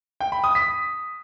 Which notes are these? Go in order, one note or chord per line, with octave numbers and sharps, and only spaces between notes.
G5
B5
D#6
B6